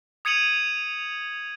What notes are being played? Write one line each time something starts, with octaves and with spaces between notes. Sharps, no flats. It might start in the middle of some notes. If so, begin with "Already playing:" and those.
D#6 G#6 C#7 D#7 F7 F#7